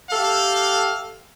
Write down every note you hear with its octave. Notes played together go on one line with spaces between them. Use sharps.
G4 A4 E5 F5